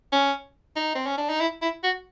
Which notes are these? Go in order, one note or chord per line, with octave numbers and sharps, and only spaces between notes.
C#4
D#4
C4
C#4
D4
D#4
E4
E4
F#4